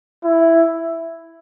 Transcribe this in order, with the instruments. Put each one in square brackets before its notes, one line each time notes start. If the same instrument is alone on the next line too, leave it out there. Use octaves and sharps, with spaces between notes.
[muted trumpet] E4